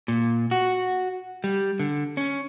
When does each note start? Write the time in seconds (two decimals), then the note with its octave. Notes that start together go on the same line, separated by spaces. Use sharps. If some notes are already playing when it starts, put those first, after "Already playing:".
0.08 A#2
0.51 F#4
1.44 G3
1.80 D3
2.17 C#4